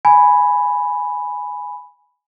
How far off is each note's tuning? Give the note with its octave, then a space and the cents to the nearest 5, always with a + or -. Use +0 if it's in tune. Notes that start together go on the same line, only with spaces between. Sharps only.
G#5 +0 B5 +0